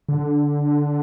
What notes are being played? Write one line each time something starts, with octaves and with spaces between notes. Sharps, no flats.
D3